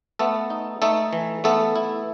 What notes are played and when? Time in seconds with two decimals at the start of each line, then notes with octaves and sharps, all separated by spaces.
0.19 A3 B3 A4
0.50 D#4
0.82 A3 D#4 A4
1.13 E3
1.44 A3 B3 A4
1.76 E4